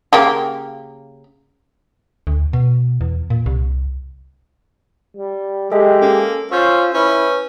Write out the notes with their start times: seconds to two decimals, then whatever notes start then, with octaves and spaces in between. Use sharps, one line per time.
0.13 C#3 A#3 G4
2.27 D2
2.53 B2
3.01 E2
3.30 A#2
3.46 C2
5.17 G3
5.72 G#3 G4 A4 D#5 E5
6.02 A#3 C#4 A4
6.52 C#4 F4 C5 E6 G6
6.94 C#4 E4 B4